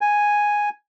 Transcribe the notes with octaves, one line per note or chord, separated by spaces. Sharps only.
G#5